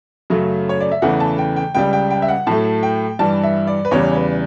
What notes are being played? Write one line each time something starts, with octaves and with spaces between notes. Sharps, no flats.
F#2 C#3 F#3 A3
C#5
D5
E5
E2 C#3 E3 A3 F#5
A5
G5
G5
C#2 C#3 G3 G5
G5
G5
E5
F#5
A2 F#3 A3 A5
G5
G2 E3 G3 A5
E5
D5
B4
E2 C#3 E3 G3 C#5
B4